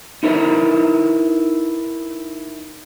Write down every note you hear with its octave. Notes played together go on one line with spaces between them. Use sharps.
D#4 E4 A#4 B4 D#5